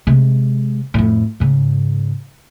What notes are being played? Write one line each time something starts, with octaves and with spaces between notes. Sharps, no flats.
C3 G#3
F2 A2
G#2 C#3